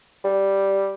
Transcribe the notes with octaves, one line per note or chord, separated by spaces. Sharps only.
G3